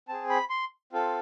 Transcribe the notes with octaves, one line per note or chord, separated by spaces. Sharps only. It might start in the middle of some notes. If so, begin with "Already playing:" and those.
C4 G#4 A5
B5
C6
C4 F4 A4